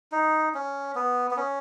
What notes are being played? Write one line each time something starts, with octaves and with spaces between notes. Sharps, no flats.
D#4
C#4
B3
B3
C#4